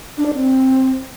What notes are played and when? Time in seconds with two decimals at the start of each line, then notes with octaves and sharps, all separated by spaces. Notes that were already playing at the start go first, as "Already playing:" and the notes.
0.18 D4
0.26 D5
0.34 C4